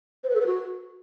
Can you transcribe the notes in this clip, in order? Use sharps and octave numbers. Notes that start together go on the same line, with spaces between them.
C5
B4
A4
B4
F#4